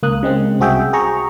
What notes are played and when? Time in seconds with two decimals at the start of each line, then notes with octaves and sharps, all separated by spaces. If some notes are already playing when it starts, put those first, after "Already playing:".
0.03 C#2 A#3 D#6 F#6
0.23 C#3 G#3 C4
0.60 C2 C4 F#4 G#4 E5 G5
0.93 G#4 A#5 C#6